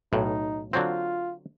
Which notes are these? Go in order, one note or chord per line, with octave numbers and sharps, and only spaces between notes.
B1 A2 D#4
D3 F#3 C4 F4